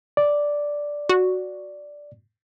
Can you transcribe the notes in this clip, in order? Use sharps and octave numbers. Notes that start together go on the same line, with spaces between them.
D5
F#4